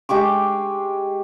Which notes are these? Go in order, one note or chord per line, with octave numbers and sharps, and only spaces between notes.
G#3 G4 C#6 D6